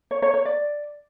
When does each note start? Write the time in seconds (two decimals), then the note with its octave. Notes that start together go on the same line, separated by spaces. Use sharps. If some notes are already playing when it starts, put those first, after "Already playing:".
0.11 C#5
0.22 C#5
0.34 C#5
0.45 D5